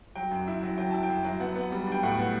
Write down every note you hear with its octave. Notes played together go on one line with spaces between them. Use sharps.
F#3 G5
F#2
E4
F#3
F#3 G5
E4 A5
G5
F#2
F#3
B3 F#5
B3
G3
D4 G5
A2 F#5
B3